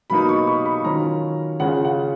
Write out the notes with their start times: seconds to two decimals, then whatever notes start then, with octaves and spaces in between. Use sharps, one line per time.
0.10 B2 F#3 A#3 D#4 B5
0.29 C#6
0.47 C#6
0.66 B5
0.84 D#3 F#3 C#4 F4 A#5
1.60 C#3 G#3 C#4 F4 F#5
1.85 F#5